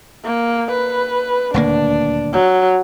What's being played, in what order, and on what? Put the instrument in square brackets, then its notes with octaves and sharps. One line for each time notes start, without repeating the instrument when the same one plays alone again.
[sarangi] A#3
B4
[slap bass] D#1 D2 A#3 [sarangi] D4
[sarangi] F#3